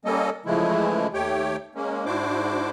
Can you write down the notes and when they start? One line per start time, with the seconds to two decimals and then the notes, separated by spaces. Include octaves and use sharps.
0.05 G3 A#3 C#4 A4 D#5
0.46 C#3 E3 F3 G#3 A3 E4
1.14 D#2 A3 G4 C#5 G5
1.75 G#3 A#3 C#4
2.06 G#2 D4 E4 F#4 C5 D6